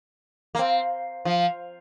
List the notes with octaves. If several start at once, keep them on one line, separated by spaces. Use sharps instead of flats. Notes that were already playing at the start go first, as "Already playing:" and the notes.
A#3
C4
F3